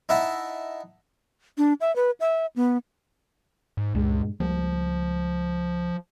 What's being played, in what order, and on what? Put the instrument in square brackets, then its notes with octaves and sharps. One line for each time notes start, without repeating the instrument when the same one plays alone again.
[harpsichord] D#4 E4 D#5 E5 F#5 A5
[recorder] D4
E5
B4
E5
B3
[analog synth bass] G#2
[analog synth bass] C#2 [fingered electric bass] G2 A#2 G#3
[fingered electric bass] C#2 G3 A#3 [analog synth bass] F3